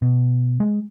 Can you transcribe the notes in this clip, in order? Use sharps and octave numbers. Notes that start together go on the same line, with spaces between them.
B2
G#3